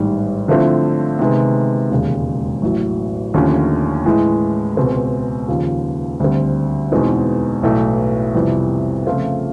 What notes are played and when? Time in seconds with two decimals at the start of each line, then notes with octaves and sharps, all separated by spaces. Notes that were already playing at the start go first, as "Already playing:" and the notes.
Already playing: A1 G#2 D#3 G3
0.48 D3 F3 A3 C4 E4
1.19 C3 D#3 G#3 B3
1.91 E1 D#2 C#3
2.62 A1 A2 F#3
3.34 D#2 D3 F3 A3 C#4
4.05 A2 E3 G#3
4.77 C#2 B2 G#3 C4
5.48 D#2 C#3 F3
6.20 D2 D3 G3 C4
6.92 E2 B2 G#3 C4 D#4
7.63 B1 A2 E3 A3
8.34 F2 C3 E3 G3 B3
9.06 C#3 F3 A3 C4 F4